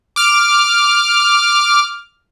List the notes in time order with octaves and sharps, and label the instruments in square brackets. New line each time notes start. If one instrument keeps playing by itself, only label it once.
[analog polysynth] D6 F6